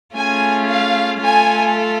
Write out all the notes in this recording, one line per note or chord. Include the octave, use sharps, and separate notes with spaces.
A3 C#4 F4 G#4 G#5
F5
A3 F4 A4 G#5